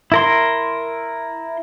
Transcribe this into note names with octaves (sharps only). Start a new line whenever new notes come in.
E4 A#4 C6